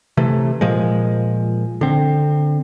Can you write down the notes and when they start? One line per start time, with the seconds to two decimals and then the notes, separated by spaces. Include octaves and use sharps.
0.17 C3 E3 A3
0.61 A#2 F3 G#3
1.81 D3 C4